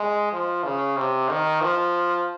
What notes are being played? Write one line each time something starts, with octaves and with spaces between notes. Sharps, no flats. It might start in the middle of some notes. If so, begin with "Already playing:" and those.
Already playing: G#3
F3
C#3
C3
D#3
F3